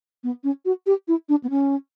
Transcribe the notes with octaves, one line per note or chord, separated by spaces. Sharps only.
B3
C#4
F#4
G4
E4
D4
B3
C#4